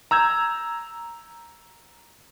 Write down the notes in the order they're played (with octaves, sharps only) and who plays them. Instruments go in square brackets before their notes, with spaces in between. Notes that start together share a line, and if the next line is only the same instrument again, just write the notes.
[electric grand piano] A#5 E6 G6 G#6